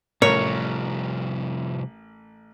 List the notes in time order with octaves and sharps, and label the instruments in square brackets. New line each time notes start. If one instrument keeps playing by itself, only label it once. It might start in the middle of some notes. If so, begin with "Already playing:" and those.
[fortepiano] A1 A#4 [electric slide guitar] C3 F3 G3 [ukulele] C#5